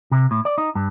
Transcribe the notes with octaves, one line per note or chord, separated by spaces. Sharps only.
C3
A2
D5
D#4
G2